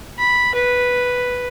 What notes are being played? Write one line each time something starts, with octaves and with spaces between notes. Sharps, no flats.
B5
B4